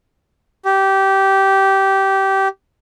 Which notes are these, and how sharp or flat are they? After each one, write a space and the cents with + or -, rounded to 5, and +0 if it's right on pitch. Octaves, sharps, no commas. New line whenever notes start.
G4 -15